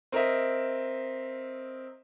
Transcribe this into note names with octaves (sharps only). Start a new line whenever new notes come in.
C4 A#4 D#5 E5